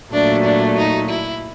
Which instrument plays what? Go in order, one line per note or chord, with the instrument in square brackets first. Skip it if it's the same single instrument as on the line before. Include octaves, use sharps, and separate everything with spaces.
[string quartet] A#2 F#3 A3 [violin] D4
[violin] D4
D#4
E4